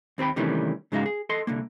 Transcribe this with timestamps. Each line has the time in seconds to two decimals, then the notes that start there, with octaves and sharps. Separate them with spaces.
0.18 D#2 C4 B4 G5 B5
0.36 C3 D#3 E3 G3 A3 C#4
0.92 G#2 C#3 G#3 D#4 F#4 F5
1.06 G#4
1.29 A4 D#5 C6
1.47 C2 D3 A#3